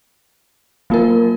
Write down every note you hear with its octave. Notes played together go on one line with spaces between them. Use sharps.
F#3 A#3 F4 A#4